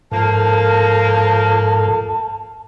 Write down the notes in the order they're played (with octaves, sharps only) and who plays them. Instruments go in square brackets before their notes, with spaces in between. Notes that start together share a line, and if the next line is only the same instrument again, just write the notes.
[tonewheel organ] G#2 A4 [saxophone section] F3 A#3 [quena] A5